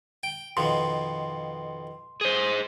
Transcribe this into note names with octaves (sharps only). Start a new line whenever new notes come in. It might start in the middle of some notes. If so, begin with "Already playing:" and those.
G5
F2 B2 D#3 C6
G#4 C5